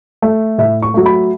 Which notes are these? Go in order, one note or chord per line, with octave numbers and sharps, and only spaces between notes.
A3
A2 E5
C#6
F#3 A3
B5